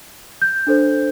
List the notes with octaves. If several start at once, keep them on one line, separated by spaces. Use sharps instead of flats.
G6
D4 A4 C5